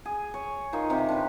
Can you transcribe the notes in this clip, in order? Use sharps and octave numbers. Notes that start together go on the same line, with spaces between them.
G#4
C#5
D#3 D#4 F4 C5
C3 G4
D4 B4